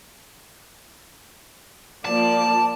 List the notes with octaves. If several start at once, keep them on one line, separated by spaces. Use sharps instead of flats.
F3 A#3 D5 A5